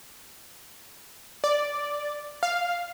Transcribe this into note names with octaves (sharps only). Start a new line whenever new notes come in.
D5
F5